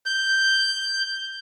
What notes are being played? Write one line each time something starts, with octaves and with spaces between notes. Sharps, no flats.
G6